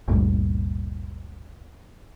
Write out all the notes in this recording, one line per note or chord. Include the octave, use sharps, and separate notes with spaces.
G1 D2 G2 A#2